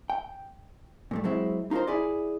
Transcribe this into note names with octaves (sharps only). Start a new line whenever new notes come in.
G5
A#2 G3 A3
F#3 G#3 C4 E4
D#4 F4 G4 A#4 C5
E4 G#4 D5